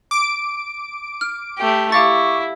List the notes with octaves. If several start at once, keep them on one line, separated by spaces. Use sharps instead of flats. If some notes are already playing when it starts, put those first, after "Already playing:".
D6 D7
F6
A3 G4
E4 G4 F5 C#6 D6 A6